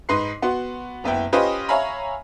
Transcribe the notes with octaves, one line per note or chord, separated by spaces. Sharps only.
G#2 D#4 B4 C6 C7
B3 F#4 C6
F#1 B3 E4 G5
C#4 F4 G4 B4 C5 D#5
C#5 E5 F5 G#5 A#5 B5